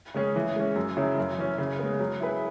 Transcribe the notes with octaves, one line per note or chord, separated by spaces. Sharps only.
C#3 G#3 C#4 G#4
E3
G#3 C#4
F#2
C#3 F#3 E4
F#2
E3 C#4
C#3
G#3 B3
F#3
E4 G#4 B4